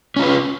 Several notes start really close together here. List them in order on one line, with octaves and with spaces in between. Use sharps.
C#4 F4 B4